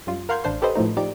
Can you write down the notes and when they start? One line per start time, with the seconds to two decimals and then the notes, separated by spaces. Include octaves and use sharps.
0.07 F#2 G3 F4
0.29 A#4 F5 F#5 C6 G6 G#6
0.44 A1 D4 C5 C6
0.62 G4 A4 B4 C5 D#5
0.75 A2 F3 A3 D#4
0.97 F3 D#4 G4 D5 D7